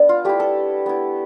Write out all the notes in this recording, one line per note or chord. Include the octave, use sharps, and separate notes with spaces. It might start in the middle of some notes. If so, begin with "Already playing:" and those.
Already playing: B3 D4
F4
A3 E4 G4
A4
B3 E4